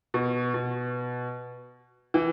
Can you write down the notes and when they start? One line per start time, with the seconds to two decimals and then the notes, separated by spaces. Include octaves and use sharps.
0.14 B2
0.54 B2
2.14 E3